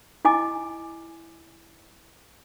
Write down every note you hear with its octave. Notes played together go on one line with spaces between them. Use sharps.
E4 D#5 G#5 D6